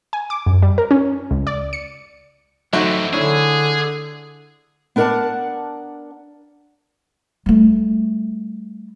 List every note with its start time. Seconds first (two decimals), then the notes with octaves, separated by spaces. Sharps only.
0.13 G#5
0.30 D6
0.46 F#2
0.62 G3
0.78 A#4
0.91 C#4
1.31 C#2
1.47 D5
1.73 C#7
2.73 D3 E3 F#3 A3 C4 D#4 F#4
3.13 D3 D4 E4 G#4 C#5
4.96 B3 D4 A#4 D5 F#5 A5
7.46 G3 A3